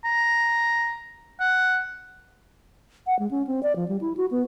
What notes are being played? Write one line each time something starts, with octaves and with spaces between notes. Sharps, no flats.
A#5
F#5
F#5
G#3
C#4
C4
D5
F3
G3
E4
F#4
B3